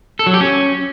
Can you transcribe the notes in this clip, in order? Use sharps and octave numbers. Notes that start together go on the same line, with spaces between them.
A4
F#3
G4
C#4